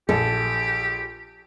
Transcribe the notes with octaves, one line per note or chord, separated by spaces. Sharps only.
A#1 G4 A4